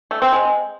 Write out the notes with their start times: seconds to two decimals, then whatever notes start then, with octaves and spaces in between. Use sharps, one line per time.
0.11 A3
0.22 C4
0.33 G#3